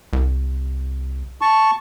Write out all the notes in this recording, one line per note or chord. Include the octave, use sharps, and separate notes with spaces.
C2
A5 C#6